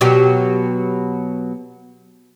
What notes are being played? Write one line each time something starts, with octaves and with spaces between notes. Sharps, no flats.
B2 F#3 G4